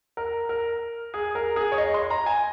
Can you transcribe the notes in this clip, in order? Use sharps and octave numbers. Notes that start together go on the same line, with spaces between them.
A#4
A#4
G#4
A#4
G#4
C#5
D#5
C6
A#5
G#5